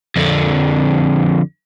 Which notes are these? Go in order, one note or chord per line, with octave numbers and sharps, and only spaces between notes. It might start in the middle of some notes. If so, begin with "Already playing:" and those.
F2 D3